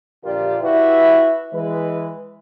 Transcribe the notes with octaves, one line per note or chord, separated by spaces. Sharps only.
A#1 D3 F4 G4 A#4 D5
E4 F#4 G4 B4 E5
E3 G#3 B4